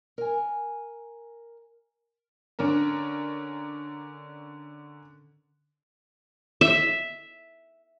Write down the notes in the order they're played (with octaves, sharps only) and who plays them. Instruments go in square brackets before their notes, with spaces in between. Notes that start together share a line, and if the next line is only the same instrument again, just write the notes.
[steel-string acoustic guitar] A#4 G#5
[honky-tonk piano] D3 C#4 D4 A#4
[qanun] E5